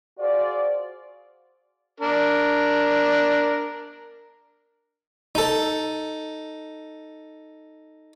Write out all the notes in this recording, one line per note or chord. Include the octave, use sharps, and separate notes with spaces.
F4 F#4 G#4 C5 D5
D4 A#4
D#4 A4